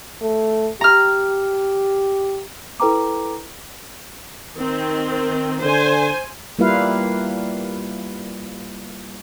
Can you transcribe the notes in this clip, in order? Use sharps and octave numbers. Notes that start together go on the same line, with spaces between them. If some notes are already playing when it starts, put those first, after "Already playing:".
A3
G4 A#5 F6
E4 A4 B4 G5 A#5 D6
D#3 C4
D3 C5 G#5
G3 A#3 E4 F4 B4 F5